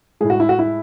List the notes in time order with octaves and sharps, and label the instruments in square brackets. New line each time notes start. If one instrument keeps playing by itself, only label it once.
[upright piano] G#3 G#4
A2
F#4
E4
F#4
E4